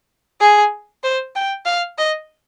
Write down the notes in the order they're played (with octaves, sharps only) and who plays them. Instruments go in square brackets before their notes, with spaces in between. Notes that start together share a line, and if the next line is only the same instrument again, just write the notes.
[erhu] G#4
C5
G5
F5
D#5